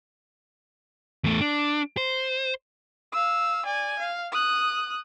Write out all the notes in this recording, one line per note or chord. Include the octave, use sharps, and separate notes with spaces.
E2 A3
D4
C5
F5 E6
D5 G#5
F5
D#6 F#6